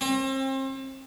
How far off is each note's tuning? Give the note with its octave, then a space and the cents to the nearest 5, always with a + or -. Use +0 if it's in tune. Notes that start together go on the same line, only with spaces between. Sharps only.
C4 +35